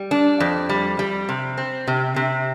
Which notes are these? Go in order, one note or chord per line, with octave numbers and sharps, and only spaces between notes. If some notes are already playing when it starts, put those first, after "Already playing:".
Already playing: G3
D4
F2
G3
G3
C3
C4
C3
C3